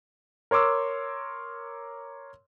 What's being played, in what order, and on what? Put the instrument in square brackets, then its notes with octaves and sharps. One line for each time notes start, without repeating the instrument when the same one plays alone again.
[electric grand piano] A#4 C#5 C6 D6 E6